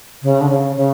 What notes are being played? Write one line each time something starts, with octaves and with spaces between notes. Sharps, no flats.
C#3
D3
C#3
C#3